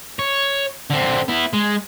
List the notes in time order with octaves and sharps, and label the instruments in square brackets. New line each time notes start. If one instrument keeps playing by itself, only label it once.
[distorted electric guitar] C#5
D3 C4
B3 E4
G#3